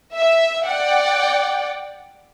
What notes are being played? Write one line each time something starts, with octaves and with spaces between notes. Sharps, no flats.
E5
D5 F#5 G5